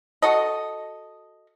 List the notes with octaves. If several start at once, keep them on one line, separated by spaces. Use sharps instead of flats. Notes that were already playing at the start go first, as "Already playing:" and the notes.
F#4 A4 D#5